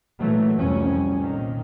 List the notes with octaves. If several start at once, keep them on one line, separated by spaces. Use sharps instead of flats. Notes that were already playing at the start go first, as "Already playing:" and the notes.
A#2 E3 F#3 A3
C2 F2 C#4
A#2 D#3